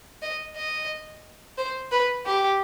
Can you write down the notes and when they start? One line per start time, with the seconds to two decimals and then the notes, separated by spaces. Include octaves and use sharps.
0.22 D#5
0.56 D#5
1.58 C5
1.92 B4
2.26 G4